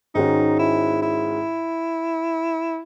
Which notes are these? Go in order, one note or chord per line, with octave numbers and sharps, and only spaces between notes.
G#2 D#3 G#3 C#4 D#4 F#4
E4
E4